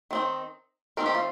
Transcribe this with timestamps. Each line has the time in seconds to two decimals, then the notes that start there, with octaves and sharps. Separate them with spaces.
0.11 D#3 C4 D#4
0.97 D#3 C4 D#4 A#4
1.06 G4
1.15 F4